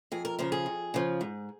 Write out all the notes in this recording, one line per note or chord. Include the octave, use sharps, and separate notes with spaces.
F2 G#4
A#4
C#3 F3 A#4
G#4
F2
C#3 F3
G#2